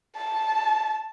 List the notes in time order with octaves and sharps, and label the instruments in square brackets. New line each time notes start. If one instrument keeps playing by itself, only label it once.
[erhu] A5